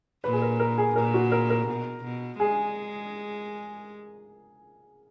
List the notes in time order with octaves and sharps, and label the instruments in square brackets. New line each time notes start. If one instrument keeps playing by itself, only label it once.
[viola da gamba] A#2 [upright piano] B4
[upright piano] G#4
A#4
A#4
G#4
[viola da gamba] A#2 [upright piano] A#4
[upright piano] F#4
A#4
A#4
[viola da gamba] B2
B2
[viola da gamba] G#3 [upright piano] G#4